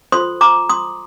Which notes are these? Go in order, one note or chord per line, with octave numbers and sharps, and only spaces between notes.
F4 A4 C5 C6 D#6
A#5 D6
C6 D#6